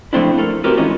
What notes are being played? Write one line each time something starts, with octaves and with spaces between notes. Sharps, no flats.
F3 A3 C4 D4 E4
A3 A4 A#4
C4 E4 F#4 G4 A#4 B4
D#3 E3 G#3 C#4 D#4 F4